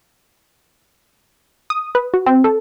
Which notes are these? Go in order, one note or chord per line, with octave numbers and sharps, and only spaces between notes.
D#6
B4
F#4
C4
A4